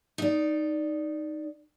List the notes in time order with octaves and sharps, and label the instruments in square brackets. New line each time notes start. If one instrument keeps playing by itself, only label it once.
[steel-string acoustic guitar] D#4 D5